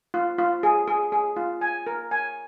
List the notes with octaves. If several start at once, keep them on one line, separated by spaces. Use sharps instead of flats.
F4
F4
G#4
G#4
G#4
F4
G#5
A#4
G#5